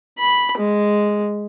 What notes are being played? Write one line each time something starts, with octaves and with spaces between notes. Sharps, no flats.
B5
G#3